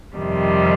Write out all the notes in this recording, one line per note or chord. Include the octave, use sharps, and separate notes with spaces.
F2 C3 D#3 G3